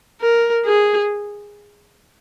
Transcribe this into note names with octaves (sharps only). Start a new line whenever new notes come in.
A#4
G#4